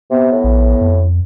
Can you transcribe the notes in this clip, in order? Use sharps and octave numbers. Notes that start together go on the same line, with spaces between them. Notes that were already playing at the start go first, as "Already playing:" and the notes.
C3 B3
A2
A#1
F2